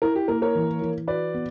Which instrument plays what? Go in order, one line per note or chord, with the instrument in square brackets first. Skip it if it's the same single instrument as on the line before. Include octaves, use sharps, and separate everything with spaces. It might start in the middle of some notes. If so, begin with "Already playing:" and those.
[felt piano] E4 [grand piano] A#4
[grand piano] G4
[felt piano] A#3 [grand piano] A#4
[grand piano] A#4 C#5
[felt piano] E3
E3
[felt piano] F#4 [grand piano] B4 D5
[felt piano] B3